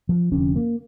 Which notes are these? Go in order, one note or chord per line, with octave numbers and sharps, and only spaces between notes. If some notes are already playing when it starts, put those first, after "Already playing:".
F3
F1 F2 D3 C#4
A#3